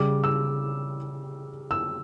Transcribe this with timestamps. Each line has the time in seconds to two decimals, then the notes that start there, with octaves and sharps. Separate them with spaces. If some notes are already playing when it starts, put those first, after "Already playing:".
Already playing: C#3 G3 D6
0.24 E6
1.71 E6